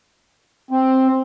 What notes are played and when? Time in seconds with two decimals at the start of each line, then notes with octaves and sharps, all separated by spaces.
0.71 C4